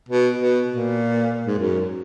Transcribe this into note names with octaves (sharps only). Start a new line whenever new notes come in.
B2
B2
A#2
G#2
F#2